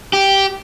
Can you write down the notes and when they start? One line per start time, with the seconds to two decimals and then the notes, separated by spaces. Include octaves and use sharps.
0.13 G4